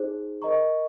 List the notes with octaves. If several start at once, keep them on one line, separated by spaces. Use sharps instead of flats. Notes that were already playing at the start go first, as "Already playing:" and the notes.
Already playing: D#4 G#4 C5
A#4 D#5 A#5 C#6